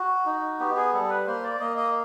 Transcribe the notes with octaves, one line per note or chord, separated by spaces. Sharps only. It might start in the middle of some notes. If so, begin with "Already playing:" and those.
Already playing: F#4
D#4
B3 G4
G#4
G3 A4
B4
A#3 C5
D5
A#3 D#5
D#5